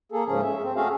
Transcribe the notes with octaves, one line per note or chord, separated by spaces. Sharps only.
A#3 G#4 A4
G#2 C#3 F3 C#4 G#4
E5
C4
A3 C#4 F#4 G#4 E5 F5